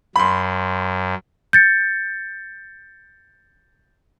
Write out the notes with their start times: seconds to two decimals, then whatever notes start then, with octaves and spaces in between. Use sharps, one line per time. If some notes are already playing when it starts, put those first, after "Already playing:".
0.16 F#2 B5 C6
1.53 G6 A6 C#7